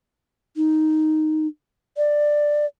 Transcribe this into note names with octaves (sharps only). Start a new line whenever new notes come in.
D#4
D5